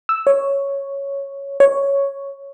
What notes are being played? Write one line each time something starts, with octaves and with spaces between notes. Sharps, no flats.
E6
C#5
C#5